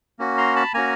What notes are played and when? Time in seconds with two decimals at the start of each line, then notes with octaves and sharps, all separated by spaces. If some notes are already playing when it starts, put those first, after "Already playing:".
0.19 A#3 C#4 F#4
0.38 A#5 C6
0.56 A5 B5
0.74 A#3 C#4 F#4 G#5 A#5